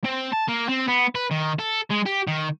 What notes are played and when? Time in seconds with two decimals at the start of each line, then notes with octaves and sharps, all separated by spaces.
0.04 C4
0.32 A5
0.48 A#3
0.69 C4
0.88 B3
1.15 B4
1.31 D#3
1.59 A4
1.90 G#3
2.06 G4
2.28 D#3